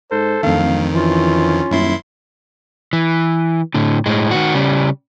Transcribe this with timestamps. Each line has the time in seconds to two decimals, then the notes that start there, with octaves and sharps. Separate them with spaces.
0.12 G#2 A4 C5
0.43 D1 F2 D#3 F5
0.94 E3 C#4 F4
1.71 D#1 F#2 E4 C6
2.93 E3
3.74 A2 D3
4.06 A2 G#3
4.31 D#3 F#4
4.55 C#3 G3